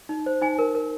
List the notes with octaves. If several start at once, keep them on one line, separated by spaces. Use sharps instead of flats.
D#4
C5
D#4 G#5
A#4
A#4